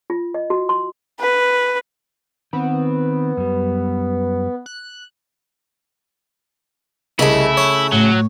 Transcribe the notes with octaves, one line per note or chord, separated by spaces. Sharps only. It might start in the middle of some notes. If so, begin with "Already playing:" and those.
F4
D#5
F#4
C6
B4
D#3 B3 C4
F#2 G3
F#6
C2 C#3 G#3 A3 E4 B5
C#5
A2 F#3